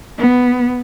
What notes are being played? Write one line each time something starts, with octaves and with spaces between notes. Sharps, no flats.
B3